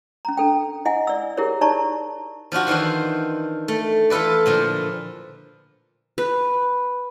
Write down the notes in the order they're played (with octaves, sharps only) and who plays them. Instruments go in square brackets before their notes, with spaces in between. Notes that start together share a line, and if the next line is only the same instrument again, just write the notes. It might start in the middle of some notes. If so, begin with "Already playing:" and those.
[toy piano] C#4 A#5
D4 A4 G5
E4 D#5 F#5 G#5
D5 E6
E4 G4 G#4 A#4 C#5
D#4 C#5 D5 A5 A#5 C#6
[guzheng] F3 D4 F4 F#4
D#3 E3 D4 F4 C5
A3
E3 F4 A4 B4 D5
A#2 D3 F3
[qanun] B4